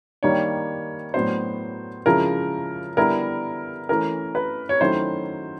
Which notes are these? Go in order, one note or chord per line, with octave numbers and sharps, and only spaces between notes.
D#3 G3 A#3 D4 C#5
A2 F#3 B3 D4 C5
C#3 F3 G#3 C#4 E4 A#4
D3 G3 B3 E4 A#4
E3 A3 C#4 A#4
B4
C#5
D#3 F#3 A3 C#4 E4 C5